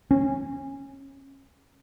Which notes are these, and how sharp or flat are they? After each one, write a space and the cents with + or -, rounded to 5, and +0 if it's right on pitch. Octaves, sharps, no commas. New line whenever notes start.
C#4 -25